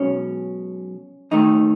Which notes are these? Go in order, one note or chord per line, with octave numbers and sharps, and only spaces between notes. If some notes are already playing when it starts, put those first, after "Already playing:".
Already playing: B1 B2 G#3 C#4
D#2 D#3 A3 D#4